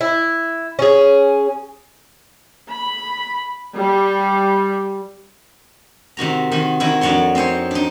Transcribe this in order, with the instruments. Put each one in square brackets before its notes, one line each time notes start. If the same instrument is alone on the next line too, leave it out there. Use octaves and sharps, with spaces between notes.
[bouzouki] E4
C#4 G#4
[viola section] B5
G3
[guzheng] C3 D#3 F#4 A#5
D#3 F#4
D#3 E4 F#4
F2 D4 F#4 C#5 C6
C4 D#4 C5 C#5
D4 D#4